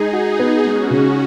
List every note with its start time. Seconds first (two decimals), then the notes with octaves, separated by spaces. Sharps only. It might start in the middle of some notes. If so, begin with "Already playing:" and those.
Already playing: G#3 D#4 G#4
0.13 D#4 F#4 G#4
0.39 B3
0.65 G#3 C#4 F#4
0.90 C#3